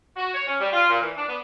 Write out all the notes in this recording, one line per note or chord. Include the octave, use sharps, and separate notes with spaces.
F#4
C#5
C#4
G3
F4
A#2
E3
D4
B3